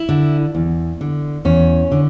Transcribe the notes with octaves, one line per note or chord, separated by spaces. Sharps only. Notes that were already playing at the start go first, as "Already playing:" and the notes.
Already playing: E4
D3
E2
D3
E2 C#4
D3